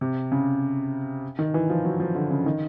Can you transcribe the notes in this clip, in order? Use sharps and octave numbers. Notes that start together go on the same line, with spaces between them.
C3
C#3
D#3
E3
F3
F#3
F3
D3
C#3
D#3